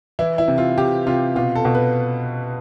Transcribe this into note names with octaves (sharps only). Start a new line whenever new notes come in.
E3 E4
E4
C3
F4
C3 G4
C3 F4
B2 F4
A4
B2
B4